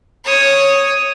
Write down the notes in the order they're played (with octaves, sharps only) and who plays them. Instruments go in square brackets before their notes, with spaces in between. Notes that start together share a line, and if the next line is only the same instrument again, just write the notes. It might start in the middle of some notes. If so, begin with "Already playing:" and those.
[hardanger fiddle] C#5 D#6